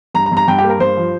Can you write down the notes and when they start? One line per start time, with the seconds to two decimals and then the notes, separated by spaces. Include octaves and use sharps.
0.14 G2 A#5
0.26 A#5
0.32 G2
0.37 A#5
0.48 G2 G5
0.58 G4
0.64 A#3
0.69 A#4
0.80 G2 C5
0.97 F3